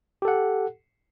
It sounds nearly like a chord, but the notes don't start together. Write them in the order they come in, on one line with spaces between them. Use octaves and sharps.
G4 A4 F#5